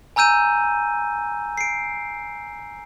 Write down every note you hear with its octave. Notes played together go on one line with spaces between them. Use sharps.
G#5 A#5 E6 G6 D#7
C7 D7